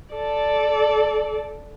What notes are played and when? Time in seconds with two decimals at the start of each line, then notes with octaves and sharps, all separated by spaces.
0.14 A4 D5